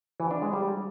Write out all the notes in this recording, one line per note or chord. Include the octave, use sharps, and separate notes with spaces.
E3
D4
G#3
G3